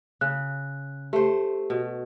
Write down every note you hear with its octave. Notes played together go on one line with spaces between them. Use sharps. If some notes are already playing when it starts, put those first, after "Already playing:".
C#3 F#6
A3 G4 C5
B2